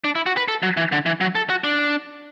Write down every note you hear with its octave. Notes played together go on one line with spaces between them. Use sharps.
D4
E4
F#4
B4
A4
F#3
E3
D3
E3
F#3
A4
F#4
D4